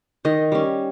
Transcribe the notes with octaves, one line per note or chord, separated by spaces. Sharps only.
D#3 D#5
G3 C#4